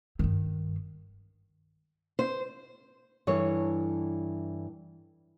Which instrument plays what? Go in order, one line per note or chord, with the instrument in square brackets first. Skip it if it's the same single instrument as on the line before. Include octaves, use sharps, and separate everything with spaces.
[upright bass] G2 D#3
[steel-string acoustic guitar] C5
[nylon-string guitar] G2 E3 A4 C#5